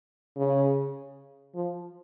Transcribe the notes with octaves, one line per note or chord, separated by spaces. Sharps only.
C#3
F3